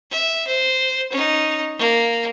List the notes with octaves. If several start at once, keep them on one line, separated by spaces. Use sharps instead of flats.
E5
C5
C#4 D#4
A#3